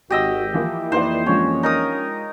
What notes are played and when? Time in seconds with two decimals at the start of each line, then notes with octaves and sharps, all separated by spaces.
0.10 G#1 F#4 G4 D#5 E6
0.54 E3 F3 A#3 E4
0.92 F2 E3 A#3 D#4 B4 C5 D5
1.26 F3 G#3 C#4 D4 C#5
1.63 D#4 A#4 D#6